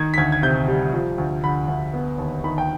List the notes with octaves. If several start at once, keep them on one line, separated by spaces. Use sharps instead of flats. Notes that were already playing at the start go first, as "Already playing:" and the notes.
Already playing: D#3 G#6
B6
D2 G#6
G#6
C3 G6
G3
F3
D2
D3 B5
D2
B3
D#2
D#3 B5
G5